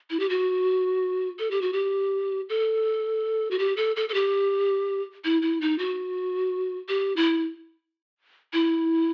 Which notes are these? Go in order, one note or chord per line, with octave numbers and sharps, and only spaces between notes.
E4
G4
F#4
A4
G4
F#4
G4
A4
F#4
G4
A4
A4
A4
G4
E4
E4
D#4
F#4
G4
E4
E4